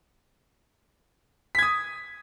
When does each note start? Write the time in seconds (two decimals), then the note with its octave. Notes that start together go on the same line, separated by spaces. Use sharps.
1.55 B6
1.59 G#6
1.62 D#6